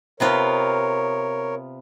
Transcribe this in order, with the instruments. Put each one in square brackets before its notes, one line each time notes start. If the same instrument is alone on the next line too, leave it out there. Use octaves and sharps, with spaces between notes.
[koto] C3 B3 F4 [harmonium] A#4 C#5